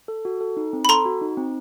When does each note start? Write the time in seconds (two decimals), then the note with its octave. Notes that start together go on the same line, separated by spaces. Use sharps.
0.08 A4
0.25 F#4
0.41 A4
0.57 D#4
0.73 C4
0.85 B5
0.89 A4 A#5 C6
1.05 F#4
1.21 D#4
1.37 C4